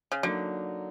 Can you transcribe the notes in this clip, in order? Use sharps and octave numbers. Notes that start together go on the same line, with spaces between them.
C#3
D3 F#3 A#3 D#4